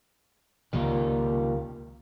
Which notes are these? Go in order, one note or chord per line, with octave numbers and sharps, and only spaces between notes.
C#2 C3 D#3 G3 A#3 F4